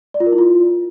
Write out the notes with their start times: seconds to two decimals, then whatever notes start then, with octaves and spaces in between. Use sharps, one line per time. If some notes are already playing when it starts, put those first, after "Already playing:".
0.14 D5
0.20 F4
0.26 A#4
0.32 E4
0.38 F4